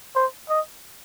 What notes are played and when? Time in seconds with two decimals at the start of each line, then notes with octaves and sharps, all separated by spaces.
0.15 C5
0.49 D#5